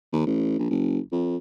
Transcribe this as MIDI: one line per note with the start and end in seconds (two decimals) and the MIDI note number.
0.12 0.22 39
0.26 0.55 33
0.59 0.66 34
0.70 0.99 30
1.12 1.37 41